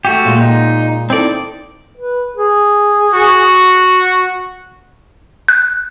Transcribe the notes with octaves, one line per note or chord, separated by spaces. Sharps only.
A3 F#4 G4
A#2 G#3
D#4
C4 D#4 E4 A4 D5
B4
G#4
F#4
F#6